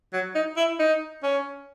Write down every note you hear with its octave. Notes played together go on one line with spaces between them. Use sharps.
F#3
D#4
E4
D#4
C#4